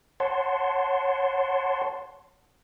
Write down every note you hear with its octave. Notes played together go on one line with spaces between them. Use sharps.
C#5 F#5 A5 C6